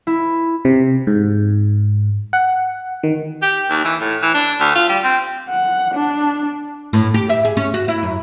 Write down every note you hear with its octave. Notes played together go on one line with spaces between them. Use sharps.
E4
C3
G#2
F#5
D#3
G4
D#2
E3
A2
E3
D4
D2
F4
G3
C4
F#5
D4
A2
G4
E5
G#4
C#4
F#4
E4
F#2